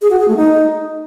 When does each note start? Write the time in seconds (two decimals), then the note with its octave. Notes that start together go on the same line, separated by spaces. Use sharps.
0.02 G#4
0.10 F#4
0.19 G#4
0.28 A3
0.37 D#4